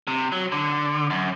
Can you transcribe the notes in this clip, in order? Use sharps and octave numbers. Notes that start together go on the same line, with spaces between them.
C3
F#3
D3
F#2